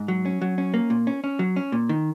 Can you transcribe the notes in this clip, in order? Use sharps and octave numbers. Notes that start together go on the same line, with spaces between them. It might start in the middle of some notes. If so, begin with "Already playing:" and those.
Already playing: G#2
F#3
C#4
F#3
C#4
A#3
A#2
C#4
C#4
F#3
C#4
A#2
D#3